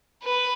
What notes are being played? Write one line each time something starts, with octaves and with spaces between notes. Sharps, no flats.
B4